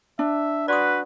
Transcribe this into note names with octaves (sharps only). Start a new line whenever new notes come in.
D4 E5
F#4 B4 D5 C6 D#6